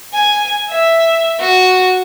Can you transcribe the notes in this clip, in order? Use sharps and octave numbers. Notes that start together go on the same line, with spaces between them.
G#5
E5
F#4